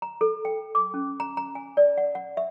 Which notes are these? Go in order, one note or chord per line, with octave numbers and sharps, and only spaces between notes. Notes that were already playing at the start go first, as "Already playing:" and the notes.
A#5
A4
G5
D6
C#4
A#5
A#5
G#5
D5
F#5
F#5
E5